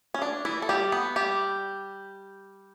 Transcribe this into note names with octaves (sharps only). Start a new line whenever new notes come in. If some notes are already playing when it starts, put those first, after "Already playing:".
C#4
D4
E3 E4
A4
G3 G4
B3 B4
G3 G4